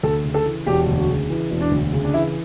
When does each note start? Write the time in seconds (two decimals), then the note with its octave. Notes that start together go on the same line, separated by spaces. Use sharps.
0.03 D2 A4
0.24 C#3
0.34 A4
0.45 E3
0.66 E1 G4
0.87 D2
0.98 F#4
1.08 C#3
1.30 E3
1.51 E1
1.60 D4
1.71 D2
1.93 C#3
2.03 D4
2.13 E3 E4